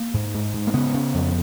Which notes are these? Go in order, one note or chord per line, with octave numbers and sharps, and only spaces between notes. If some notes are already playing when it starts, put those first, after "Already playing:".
Already playing: A#3
G#2
G#2
G#2
A#3
C#3 B3
C#3
F2